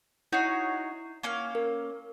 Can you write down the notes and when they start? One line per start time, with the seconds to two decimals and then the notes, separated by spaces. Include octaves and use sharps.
0.32 D#4 E4 F#4 C#5 C7
1.23 A#3 C#4 F5
1.55 A#4